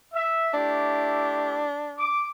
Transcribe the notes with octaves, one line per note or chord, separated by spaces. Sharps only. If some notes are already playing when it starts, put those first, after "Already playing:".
E5
A3 D4 E4 G4
D6